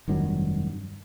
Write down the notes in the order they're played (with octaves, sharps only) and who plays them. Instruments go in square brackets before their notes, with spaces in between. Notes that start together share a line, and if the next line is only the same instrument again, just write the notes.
[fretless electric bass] F1 G2 D#3 F#3